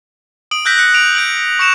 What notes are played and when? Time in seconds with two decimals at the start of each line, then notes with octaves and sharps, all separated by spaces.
0.51 D#6 D7 F#7
0.65 E6 F#6 G6 A#6 B6
0.78 F#6 C#7
0.94 D7 F7
1.15 G6 D7 F#7
1.59 C#6 C#7 E7 F7